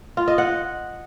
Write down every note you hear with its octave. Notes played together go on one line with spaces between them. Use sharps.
F4
D#5
F#5